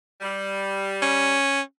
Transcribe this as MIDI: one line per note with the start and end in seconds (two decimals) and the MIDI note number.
0.20 1.36 55
1.02 1.61 61